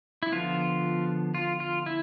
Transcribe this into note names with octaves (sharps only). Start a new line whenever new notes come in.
E4
D3 F3 B3 F4
F4
F4
E4